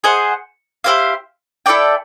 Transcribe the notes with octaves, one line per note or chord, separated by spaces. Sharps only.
G#4 C5 D#5 F#5
E4 G4 C5 F5
E4 A4 D5 G5